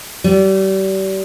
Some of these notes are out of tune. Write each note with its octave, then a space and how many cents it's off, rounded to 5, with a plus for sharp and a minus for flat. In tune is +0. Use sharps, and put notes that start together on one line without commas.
G3 -35